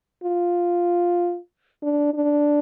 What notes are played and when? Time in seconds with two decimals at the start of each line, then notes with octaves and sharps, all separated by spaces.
0.24 F4
1.82 D4
2.14 D4